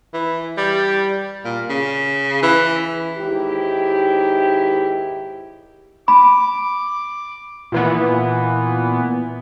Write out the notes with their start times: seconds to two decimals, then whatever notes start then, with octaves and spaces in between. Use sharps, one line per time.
0.14 E3
0.57 G3
1.45 A#2
1.70 C#3
2.43 E3
3.18 D#2 G#2 E4 G4
6.08 B5 D6
7.72 A#2 E3 B3